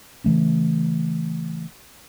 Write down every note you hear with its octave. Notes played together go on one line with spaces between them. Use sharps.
C#3 E3 A3 C#4